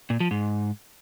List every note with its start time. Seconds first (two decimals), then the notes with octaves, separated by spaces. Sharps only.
0.10 A#2
0.20 F3
0.31 G#2